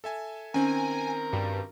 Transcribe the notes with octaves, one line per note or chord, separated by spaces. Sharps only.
A4 E5 G#5
D#3 C4 C#4 A#4 G#5
G2 F#4